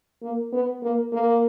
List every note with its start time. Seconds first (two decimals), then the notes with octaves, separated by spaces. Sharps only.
0.23 A#3
0.53 B3
0.83 A#3
1.13 A#3